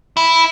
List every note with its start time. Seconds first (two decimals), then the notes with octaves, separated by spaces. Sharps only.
0.17 E4